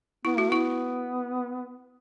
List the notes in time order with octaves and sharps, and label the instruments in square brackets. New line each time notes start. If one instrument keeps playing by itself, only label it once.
[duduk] B3 [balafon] E4
[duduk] A3 [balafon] F#4
[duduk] B3 [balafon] E4